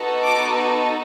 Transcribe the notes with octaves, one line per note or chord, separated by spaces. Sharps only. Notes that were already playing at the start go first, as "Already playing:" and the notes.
Already playing: B3 D#4 F#4 A4
D6